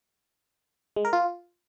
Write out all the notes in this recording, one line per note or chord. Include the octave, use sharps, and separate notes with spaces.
G#3
A#4
F4